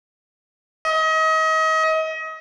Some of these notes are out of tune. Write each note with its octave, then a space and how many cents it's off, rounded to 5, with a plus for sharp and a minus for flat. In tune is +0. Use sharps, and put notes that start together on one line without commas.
D#5 +35